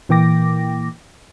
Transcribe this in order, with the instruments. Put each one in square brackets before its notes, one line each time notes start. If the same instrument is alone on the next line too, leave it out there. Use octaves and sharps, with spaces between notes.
[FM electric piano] A#2 E3 A#3 G5 D6 A#6